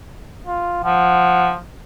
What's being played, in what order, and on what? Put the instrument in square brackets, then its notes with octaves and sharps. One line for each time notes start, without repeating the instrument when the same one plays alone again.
[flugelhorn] F4
[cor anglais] F3 [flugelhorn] F#5